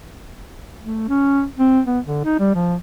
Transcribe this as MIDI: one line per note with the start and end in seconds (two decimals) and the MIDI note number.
0.83 1.06 57
1.08 1.44 61
1.58 1.81 60
1.86 1.99 59
2.06 2.20 50
2.25 2.38 63
2.39 2.54 55
2.55 2.76 53